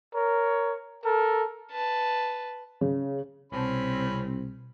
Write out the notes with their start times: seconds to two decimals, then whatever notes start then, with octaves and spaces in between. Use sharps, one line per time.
0.14 A#4 C#5
1.04 A4 A#4
1.71 B4 A5
2.81 C#3
3.52 C2 B2 C4 C#4 A5 B5